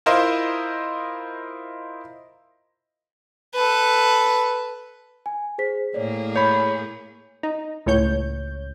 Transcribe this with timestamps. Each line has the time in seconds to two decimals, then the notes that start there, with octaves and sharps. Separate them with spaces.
0.06 E4 F4 A#4 C5 D#5 F5
3.54 A4 B4
5.26 G#5
5.58 G#4 C5 B6
5.94 A2 A#3 G#4 C#5 D5
6.36 C#5 B5 G6
7.43 D#4
7.86 C#2 A2 C#5 G6